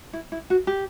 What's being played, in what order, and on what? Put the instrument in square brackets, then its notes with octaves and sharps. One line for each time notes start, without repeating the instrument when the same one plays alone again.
[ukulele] E4
E4
F#4
G4